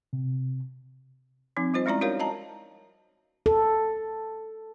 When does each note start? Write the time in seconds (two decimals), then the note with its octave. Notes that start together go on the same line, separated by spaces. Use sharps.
0.13 C3
1.57 F3 C4 D#4
1.74 G3 F4 C5 D#5
1.86 G#3 C#4 E4 D5 A#5
2.01 D#4 F#4 A#4 C#5 F5
2.20 D#5 A5 A#5
3.46 A4